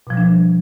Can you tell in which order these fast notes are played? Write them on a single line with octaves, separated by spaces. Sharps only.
B2 F3 G3 D4